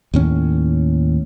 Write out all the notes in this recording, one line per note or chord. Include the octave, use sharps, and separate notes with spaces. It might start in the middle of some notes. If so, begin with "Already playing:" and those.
D#2 A2 C#4